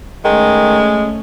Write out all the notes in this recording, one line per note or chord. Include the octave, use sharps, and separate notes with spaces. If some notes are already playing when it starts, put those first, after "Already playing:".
D#3 G#3 A3 C#4